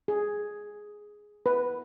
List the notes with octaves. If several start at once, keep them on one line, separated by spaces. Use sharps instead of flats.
G#4
B4